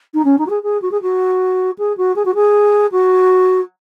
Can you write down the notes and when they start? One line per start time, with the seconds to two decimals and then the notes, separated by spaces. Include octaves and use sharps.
0.14 D#4
0.24 C#4
0.38 D#4
0.46 F#4
0.50 G#4
0.63 G#4
0.82 F#4
0.91 G#4
1.02 F#4
1.78 G#4
1.97 F#4
2.16 G#4
2.25 F#4
2.35 G#4
2.92 F#4